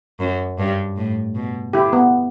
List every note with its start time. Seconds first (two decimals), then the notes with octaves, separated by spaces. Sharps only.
0.20 F#2
0.58 G2
0.97 A2
1.35 B2
1.73 D3 E4 G4
1.93 B3